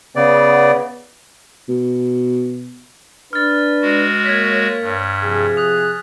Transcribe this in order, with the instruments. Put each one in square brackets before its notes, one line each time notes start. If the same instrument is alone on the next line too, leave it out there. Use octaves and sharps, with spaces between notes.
[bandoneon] C#3 D5 [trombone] B3
[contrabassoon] B2
[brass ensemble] D4 B4 [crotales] F6 A6
[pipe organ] G#3 F#4
[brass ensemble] A#3 C#5 [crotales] G#6 B6
[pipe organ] G2
[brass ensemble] C3 F3 G#4
[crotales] D#6 [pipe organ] F#6